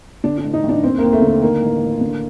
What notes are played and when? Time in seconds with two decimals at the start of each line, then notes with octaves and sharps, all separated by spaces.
0.24 D3 D4
0.38 D4
0.44 A1
0.53 D#4
0.63 A1
0.69 D4
0.83 D#2 C4
0.98 D#2 A#3
1.13 A3
1.22 D3
1.28 A#3
1.42 D#3 A#3
1.62 A1
1.81 A1
2.01 D3